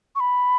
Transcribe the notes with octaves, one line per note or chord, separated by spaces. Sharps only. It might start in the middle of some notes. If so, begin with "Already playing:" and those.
C#6
B5